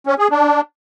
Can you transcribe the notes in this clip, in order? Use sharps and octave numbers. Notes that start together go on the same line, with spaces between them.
C#4
G#4
D4